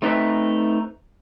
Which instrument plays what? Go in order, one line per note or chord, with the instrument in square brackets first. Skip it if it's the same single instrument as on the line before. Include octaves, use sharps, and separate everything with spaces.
[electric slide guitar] A3 C4 D#4 B4 C#5 E5